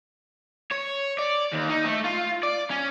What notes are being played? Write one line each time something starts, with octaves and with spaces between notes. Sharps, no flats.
C#5
D5
D#2
D#4
A3
F4
D5
C#4